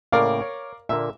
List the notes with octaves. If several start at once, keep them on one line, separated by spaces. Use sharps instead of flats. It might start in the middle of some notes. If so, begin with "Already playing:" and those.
A2 C#3 A#3 A#4 D5 F5
C#5
A#2 D3 A#3 E5